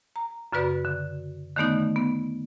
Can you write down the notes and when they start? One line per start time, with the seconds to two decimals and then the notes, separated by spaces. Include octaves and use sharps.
0.16 A#5
0.53 F#2 C#3 F#4 B4 D5 B5
0.85 D3
1.56 D3 D#3 A3 B3 D#4
1.96 B3